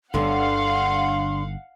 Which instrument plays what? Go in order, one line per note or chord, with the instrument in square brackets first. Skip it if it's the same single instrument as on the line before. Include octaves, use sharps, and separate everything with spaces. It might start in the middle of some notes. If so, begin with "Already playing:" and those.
[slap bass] G1 [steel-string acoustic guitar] G2 D3 [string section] F5 F#5 [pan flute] C6